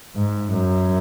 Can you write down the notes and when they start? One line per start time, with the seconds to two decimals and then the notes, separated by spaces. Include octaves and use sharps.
0.16 G#2
0.53 F#2